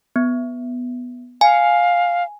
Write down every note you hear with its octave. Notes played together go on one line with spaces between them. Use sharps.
B3
F5 G#5